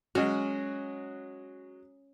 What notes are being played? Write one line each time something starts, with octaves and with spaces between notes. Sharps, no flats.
F#3 G#3 C#4 F#4